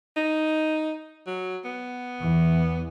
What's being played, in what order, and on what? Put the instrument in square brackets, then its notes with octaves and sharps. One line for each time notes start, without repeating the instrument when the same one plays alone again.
[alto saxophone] D#4
F#3
B3
[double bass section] E2 E3